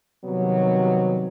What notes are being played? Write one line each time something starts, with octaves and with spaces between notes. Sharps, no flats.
C3 D#3 F#3 G3 B3